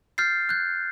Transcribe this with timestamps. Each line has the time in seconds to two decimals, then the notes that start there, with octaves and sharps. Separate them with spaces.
0.18 F6 G6 A6 C7
0.49 F#6 G6